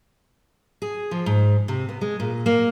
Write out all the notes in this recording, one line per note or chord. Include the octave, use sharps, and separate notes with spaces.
G#4
F3
G#2
C3
B3
G#3
A#2
A#3